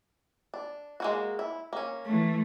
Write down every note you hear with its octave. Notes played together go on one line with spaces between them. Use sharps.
D4
G#3 A#3 F#4
E4
A#3 C#4
E3 A3